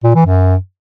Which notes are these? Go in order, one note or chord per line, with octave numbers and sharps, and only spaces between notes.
A#2
E3
F#2